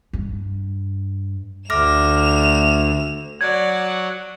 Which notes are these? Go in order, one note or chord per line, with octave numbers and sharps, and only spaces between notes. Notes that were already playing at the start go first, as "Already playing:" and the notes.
G2
D2 A3 D6 F6 A#6 E7 F7
F#3 D5 F#5 G#6